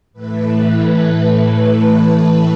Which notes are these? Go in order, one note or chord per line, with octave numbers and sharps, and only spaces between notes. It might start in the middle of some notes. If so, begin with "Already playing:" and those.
A2 E3 A3 B4